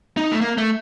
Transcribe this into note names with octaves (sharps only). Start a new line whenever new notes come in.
D#4
A3
A#3
A3